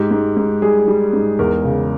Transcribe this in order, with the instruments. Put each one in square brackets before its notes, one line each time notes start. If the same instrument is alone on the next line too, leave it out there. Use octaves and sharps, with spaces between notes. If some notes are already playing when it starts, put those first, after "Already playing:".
Already playing: [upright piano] G#2 G4
G#2
G#2
G3 G#4
G3
G#2
E2 A#4
C#3